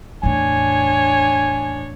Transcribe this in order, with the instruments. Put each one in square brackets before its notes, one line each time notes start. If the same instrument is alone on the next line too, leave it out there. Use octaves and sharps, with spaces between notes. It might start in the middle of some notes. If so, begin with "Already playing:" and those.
[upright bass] E2 A2 [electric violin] D4 C#5 [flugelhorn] G#5